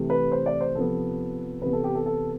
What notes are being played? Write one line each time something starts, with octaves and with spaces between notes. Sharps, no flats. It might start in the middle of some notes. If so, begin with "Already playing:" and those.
Already playing: C3 E3 A3
B4
C5
D5
C5
C3 F3 B3 A4
C3 E3 B3 B4
A4
G4
A4
A4